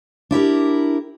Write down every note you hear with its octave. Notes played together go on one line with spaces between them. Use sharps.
D4 E4 G4 A#4